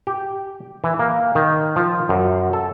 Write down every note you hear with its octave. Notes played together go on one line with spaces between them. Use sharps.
G4
E3
A#3
D#3
F3
F#2
A4